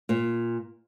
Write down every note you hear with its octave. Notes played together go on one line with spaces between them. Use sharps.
A#2